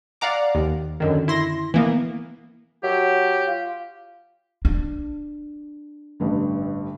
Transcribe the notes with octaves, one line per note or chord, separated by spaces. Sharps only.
D5 F5 F#5 A#5 D6
D#2
F#2 D3 D#3
E4 C6 A#6
E3 A#3 B3
F#3 G4
F4
D4
A1 G2 D3